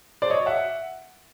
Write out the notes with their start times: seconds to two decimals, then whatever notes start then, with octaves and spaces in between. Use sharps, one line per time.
0.22 C5 D5
0.30 C#5 D#5
0.46 E5 F#5